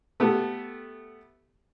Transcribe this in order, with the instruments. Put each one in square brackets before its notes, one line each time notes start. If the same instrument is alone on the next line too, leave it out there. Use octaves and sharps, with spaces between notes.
[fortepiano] A3 B3 G4 A4